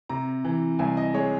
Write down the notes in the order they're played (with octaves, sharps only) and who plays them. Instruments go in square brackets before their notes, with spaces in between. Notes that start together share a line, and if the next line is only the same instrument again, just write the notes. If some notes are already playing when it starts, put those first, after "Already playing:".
[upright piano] C3 A#5
E3
C2 G#5
D#5
G#3 C#5